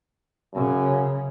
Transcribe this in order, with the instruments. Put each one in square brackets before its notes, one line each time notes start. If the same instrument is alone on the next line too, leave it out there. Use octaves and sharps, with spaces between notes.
[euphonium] F#2 [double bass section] C#3